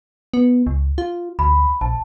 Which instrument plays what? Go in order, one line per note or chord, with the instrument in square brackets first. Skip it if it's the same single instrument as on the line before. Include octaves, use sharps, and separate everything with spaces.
[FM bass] B3
C#2
F4
[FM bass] D2 [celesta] B5
[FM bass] A#1 [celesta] A5